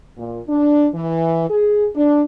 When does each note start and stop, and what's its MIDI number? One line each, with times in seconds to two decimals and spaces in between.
0.17 0.40 46
0.48 0.87 62
0.94 1.48 52
1.49 1.87 68
1.94 2.22 62